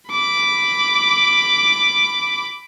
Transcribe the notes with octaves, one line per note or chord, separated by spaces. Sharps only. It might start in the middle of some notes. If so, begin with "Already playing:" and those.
B5 D6